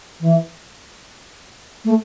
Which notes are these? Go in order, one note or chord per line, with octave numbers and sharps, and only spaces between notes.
E3
A3